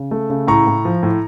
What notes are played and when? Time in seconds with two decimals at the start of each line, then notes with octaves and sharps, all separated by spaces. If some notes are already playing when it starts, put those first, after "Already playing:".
Already playing: C#3
0.11 A3
0.30 C#3
0.47 A2 A#5 C#6
0.67 A2
0.85 F3
1.03 A2